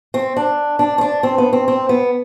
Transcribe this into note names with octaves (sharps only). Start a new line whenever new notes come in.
C4
D4
D4
C4
D4
C4
B3
C4
C4
B3